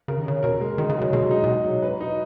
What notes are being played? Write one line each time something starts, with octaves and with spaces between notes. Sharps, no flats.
C#3 A#4
D#3
C#3 C#4
B2 A#4
G#3
D#3 D#4
C#3
F#3
C#3
B2 G#3
D#4
A#2
B2 F#4
F#3
B4
D#4